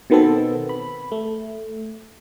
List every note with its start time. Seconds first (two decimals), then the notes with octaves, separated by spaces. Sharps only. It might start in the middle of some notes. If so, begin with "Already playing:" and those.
0.10 B2 D#3 B3 C4 A4
0.69 B5
1.12 A3